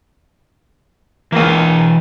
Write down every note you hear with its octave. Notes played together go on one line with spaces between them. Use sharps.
C#2 E3 A#3 D#5